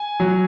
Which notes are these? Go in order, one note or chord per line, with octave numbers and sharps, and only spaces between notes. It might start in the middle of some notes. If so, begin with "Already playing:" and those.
Already playing: G#5
F#3